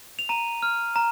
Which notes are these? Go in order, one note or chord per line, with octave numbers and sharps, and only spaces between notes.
F7
A#5 D#7
F6
A#5